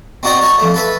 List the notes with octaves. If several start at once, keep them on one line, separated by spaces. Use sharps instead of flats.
C4 D#4 F#4 D5 D#5 A#5
C#5 D#5 A5
F2 A3
A4 B4 E5